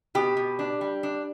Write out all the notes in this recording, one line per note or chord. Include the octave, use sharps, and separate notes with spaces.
B2 G4
B2
D4
G3
D4